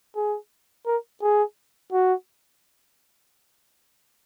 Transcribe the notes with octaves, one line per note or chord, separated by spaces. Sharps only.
G#4
A#4
G#4
F#4